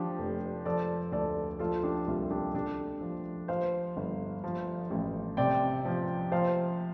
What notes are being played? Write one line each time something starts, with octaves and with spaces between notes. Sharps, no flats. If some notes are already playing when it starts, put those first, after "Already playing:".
Already playing: F3 D4 G4
F1
F3 A4 D5
D2 A4 D5
F3 F4 A4
D4 G4
C2 F4
D4 G4
D3 D4 G4
F3
F3 C5 F5
G1
F3
A1
C3 D5 G5
F3
F3 C5 F5